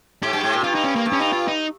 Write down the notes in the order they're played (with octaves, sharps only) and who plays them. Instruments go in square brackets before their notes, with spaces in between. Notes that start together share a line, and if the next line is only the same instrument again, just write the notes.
[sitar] G#2 [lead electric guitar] G4
[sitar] G2
G#2
A#2
[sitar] G2 [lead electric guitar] F4
[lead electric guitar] D#4
C#4
A#3
[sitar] G2
[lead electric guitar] C#4
D#4
F4
D#4